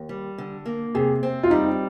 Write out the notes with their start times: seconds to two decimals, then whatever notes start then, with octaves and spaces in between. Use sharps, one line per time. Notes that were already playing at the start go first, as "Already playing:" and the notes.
Already playing: D#2
0.09 G3
0.38 D3
0.66 A#3
0.95 C3 G#4
1.23 C4
1.43 F4
1.50 G3 D#4